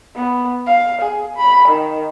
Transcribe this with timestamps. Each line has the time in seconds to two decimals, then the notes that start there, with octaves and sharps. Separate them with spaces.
0.16 B3
0.67 F5
1.01 G#4
1.37 B5
1.69 D#3